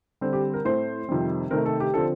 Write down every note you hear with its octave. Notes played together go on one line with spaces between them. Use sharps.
D3 G3 C4
G4
A#4
A2 A3 C4 C5
F2 C3 D#3 G3 C4
C3 D#3 A3 C4 A#4
A4
G4
D3 F3 C4 A4